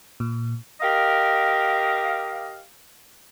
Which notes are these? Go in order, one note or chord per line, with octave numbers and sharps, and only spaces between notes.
A#2
G4 A#4 D#5 F5